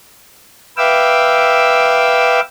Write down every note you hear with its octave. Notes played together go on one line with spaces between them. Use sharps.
B4 E5 F5 G5 D6 E6